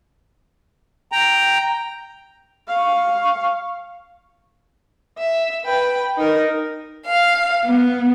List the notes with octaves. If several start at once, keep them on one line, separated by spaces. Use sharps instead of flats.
G5 A#5
F5 C#6
E5
B4 G5
D#4 A#4
F5
B3